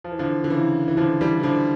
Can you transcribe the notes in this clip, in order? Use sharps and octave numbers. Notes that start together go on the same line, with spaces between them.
F3
E3
D3 F3
D3
C#3 E3
E3
D3 F3
E3 G3
E3
D3 F3